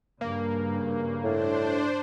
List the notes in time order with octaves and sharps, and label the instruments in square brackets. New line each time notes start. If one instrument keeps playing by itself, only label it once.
[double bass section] G2 C#3 [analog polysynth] A#3
[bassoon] A2 [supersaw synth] D4 C5